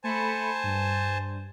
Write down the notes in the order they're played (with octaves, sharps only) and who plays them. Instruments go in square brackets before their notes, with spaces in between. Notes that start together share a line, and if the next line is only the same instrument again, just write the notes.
[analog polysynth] A3 B5 C#7 [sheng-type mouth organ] C5 G#5 A5
[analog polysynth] G2